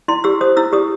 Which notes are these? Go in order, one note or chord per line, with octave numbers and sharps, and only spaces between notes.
E4 C6
G4 E6
C5 D#6
E4 E6
G4 D#6